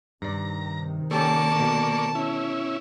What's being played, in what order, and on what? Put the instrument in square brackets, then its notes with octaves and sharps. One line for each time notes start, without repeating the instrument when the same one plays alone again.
[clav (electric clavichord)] G2 D5 [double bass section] C3 D#3 [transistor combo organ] A#5
[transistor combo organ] A#3 D5 C#6 [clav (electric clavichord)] C#4 G4 A4 [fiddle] A5
[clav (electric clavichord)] B2 D3
[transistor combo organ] C#4 E4